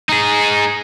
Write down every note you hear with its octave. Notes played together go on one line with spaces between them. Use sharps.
D#4 G#4